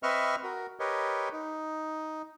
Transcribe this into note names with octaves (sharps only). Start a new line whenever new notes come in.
C4 B4 D#5 E5 C#6 F6
F#4 A#4
G4 A#4 B4 C#5 D#5
D#4